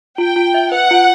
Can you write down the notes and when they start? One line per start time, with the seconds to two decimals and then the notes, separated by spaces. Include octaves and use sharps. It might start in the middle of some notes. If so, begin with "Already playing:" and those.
0.18 F4 G5
0.36 F4
0.54 E5
0.72 B4 F#5
0.91 F4